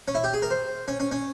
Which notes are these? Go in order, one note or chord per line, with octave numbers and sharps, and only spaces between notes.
C#4
E4
G4
G#4
A#4
C5
C#4
C#4
C#4